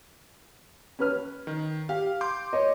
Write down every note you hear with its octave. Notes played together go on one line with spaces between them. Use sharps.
C#4 B4 F6
D#3
G4 F5
C6 D6 G6
C#5 D#5